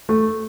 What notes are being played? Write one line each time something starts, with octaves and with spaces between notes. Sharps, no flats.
A3